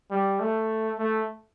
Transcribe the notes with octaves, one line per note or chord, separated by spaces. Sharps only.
G3
A3
A3